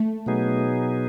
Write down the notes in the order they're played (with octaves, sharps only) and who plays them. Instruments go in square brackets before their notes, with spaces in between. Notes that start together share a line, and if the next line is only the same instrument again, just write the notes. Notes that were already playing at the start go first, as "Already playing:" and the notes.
Already playing: [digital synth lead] A3
[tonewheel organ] B2 F#3 B3 D#4 G#4